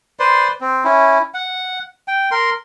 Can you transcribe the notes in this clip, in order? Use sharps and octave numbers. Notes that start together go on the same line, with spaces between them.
B4 C5 D5 C6
C4
C#4 E4
F#5
G5
A#4 C6